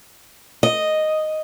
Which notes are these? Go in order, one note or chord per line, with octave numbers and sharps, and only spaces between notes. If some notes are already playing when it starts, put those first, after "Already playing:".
D#5